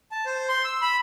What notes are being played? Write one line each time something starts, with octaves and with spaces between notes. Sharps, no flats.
A5
C5
C6
E6
B5